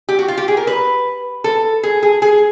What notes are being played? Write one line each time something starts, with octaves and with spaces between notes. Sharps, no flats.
G4
F#4
F4
G4
G#4
A#4
B4
A4
G#4
G#4
G#4